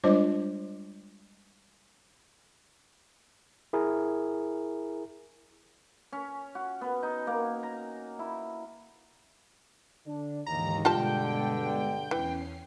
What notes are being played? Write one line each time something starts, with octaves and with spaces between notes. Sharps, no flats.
G3 G#3 D4 F4 C5 D#5
E4 G#4 A#4
C#4
F#4
B3
D#4
A#3
A#5
E4
D3 D4
D#2 G#2 D3 E3 A#5
G2 B2 D3 G#3 F4 G4 G5 A5
E2 E3 C#4 C7